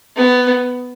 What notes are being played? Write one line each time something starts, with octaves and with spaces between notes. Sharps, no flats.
B3